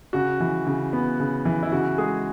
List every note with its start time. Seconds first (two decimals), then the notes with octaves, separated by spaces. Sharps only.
0.13 C#3 F#4
0.40 E3
0.67 C#3
0.93 B3
1.20 C#3
1.45 E3
1.63 E4
1.72 C#3 F#4
1.98 G#3 G#4